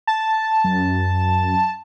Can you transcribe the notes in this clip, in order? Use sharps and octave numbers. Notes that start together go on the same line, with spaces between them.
A5
F#2